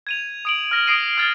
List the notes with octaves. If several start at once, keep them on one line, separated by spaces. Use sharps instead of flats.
G#6 D#7 F7
D#6 D7 F#7
F6 A#6
D#6 A#6 C7 D7 D#7
F6 G#6 A6